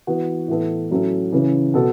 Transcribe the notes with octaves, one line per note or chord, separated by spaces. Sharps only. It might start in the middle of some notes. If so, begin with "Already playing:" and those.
E3 B3 F#4
A2 E3 B3 A4
A2 F#3 C#4 F#4 A4
C#3 E3 C#4
B2 B3 F#4 A4